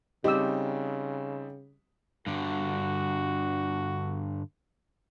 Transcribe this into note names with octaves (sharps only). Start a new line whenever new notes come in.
C#3 G3 C4 D#4 G4 E6
G2 D3 F#4